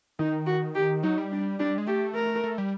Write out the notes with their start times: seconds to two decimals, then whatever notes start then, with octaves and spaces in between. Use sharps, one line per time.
0.19 D#3 D#4
0.47 F#4
0.75 G4
1.03 F#3 D#4
1.18 G3
1.32 D4
1.59 G3 D4
1.78 G#3
1.87 A3 G4
2.15 A#4
2.44 A3
2.58 G3